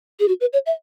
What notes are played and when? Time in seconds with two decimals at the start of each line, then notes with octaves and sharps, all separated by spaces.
0.20 G#4
0.28 F#4
0.41 B4
0.53 C#5
0.66 E5